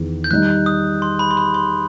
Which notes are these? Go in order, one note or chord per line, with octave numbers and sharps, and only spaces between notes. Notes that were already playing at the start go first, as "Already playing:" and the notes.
Already playing: E2 D#3
G6
D#3 G3 D#4 F#6
D#6
C6
B5
C6
B5
C6